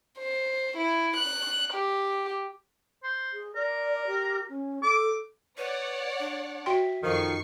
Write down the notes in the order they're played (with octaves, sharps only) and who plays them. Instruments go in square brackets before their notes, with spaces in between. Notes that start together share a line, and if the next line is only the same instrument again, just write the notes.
[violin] C5
E4
F#6
G4
[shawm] C5
[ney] G#4
[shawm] A#4 [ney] D5
[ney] G4
C#4
[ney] A4 [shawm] D6
[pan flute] B4 [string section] C#5 D5 F#5
[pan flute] D4
[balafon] F#4 G5 C6 [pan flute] E5
[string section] F#2 C#6 C7 [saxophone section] D#3 F3 [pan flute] A4